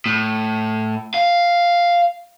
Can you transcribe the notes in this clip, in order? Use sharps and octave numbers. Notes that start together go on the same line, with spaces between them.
A2
F5